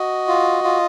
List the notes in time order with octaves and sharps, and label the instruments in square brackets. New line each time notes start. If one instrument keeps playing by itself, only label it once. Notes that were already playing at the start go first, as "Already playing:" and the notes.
Already playing: [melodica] F#4 D#5
F4
F4